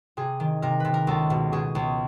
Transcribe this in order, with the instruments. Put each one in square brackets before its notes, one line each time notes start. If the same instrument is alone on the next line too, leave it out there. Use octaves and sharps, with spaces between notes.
[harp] C3 G#4
D#3
C3 A#4
C3 B4
A#4
C#2 A4
B2
B2 G#4
C#2